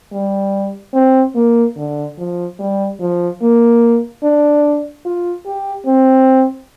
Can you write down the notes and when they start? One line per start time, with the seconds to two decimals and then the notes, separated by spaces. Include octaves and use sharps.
0.13 G3
0.94 C4
1.35 A#3
1.77 D3
2.18 F3
2.59 G3
3.00 F3
3.41 A#3
4.23 D4
5.05 F4
5.46 G4
5.87 C4